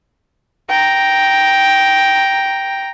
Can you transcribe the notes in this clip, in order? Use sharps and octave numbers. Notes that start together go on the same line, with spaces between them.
G5 A#5